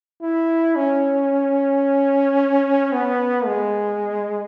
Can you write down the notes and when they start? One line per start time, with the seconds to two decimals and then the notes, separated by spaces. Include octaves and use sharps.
0.22 E4
0.76 C#4
2.92 B3
3.46 G#3